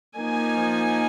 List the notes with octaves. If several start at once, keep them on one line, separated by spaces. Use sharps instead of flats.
F3 A#3 D#4 G#5